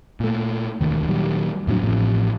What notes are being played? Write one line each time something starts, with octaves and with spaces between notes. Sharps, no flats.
A#2 A3
E1 D2 A2 D#3
A#2 D#3 F#3 G3
F2 A2 F#3 D4
A1 A2 C3 F3